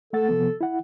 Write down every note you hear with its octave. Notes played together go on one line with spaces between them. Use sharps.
A3 A4 F#5 A6
C3 F3 B3
E4 F#5